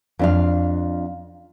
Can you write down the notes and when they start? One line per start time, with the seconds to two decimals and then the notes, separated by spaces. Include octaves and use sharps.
0.19 F2 D4 F5